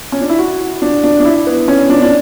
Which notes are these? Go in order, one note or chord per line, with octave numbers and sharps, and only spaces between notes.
C#4
D4
E4
F#4
D4
D4
D4
E4
B3
C#4
D4
D4